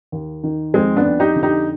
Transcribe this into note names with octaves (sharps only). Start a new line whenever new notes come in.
D#2
D#3
F2 G#3 C4
B3 D4
F2
D#4 G4
D3
D#4 G4